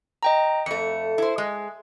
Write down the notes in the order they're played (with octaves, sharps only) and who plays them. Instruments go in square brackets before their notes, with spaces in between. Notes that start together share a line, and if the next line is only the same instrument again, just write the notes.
[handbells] D#5 G5 A#5
[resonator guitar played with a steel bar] F2 A3 [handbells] C#7
[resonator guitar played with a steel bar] E4 C5
G#3